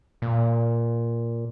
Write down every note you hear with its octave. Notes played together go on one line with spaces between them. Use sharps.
A#2